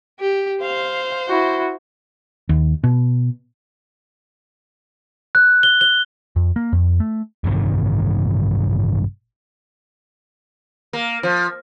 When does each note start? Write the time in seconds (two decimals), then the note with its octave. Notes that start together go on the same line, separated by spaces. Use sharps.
0.19 G4
0.62 C5 F5
1.28 E4 F#4
2.49 D#2
2.84 B2
5.35 F#6
5.63 G7
5.81 G7
6.36 F2
6.56 A#3
6.72 F2
7.00 A3
7.44 A1 G2 C3 D#3
10.93 A#3
11.23 F3